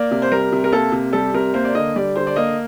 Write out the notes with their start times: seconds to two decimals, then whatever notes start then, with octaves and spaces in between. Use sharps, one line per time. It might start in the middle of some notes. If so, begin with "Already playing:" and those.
Already playing: A#3 D5
0.11 C3
0.22 C5
0.32 G3 A#4
0.52 C3
0.64 A#4
0.72 A#3 A4
0.92 C3
1.13 G3 A4
1.34 C3 A#4
1.54 A#3 C5
1.65 D5
1.75 D3 D#5
1.96 G3 D5
2.16 D3 C5
2.27 D5
2.36 A#3 D#5